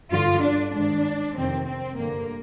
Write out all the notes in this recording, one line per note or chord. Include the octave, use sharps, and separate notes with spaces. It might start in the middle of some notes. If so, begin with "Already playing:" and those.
G2 D3 F4
D4
G#2 D#3 D4
F2 C3 D#3 C4
C4
G2 D3 A#3